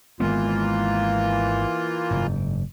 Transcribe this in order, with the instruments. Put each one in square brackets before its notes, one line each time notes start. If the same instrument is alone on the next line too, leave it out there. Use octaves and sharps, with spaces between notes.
[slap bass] G#1 G#3 B3 [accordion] E3 A#3 F4
[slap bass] F#1 G#2